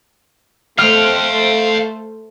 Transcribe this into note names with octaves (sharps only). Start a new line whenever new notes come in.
A3 C5 F5 G5 F6